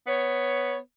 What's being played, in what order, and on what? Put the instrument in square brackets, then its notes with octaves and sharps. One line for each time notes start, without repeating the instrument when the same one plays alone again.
[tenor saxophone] B3 [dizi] C#5